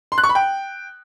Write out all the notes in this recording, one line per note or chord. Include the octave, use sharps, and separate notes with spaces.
C6
F#6
C#6
B5
G5